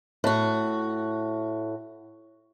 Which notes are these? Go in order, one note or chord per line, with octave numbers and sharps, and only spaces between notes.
A2 F#4